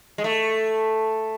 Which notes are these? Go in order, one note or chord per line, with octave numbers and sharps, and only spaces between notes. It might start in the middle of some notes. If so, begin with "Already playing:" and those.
G#3
A3